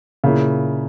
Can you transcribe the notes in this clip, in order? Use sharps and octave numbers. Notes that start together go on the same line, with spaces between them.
A#2 C#3 A#3 E4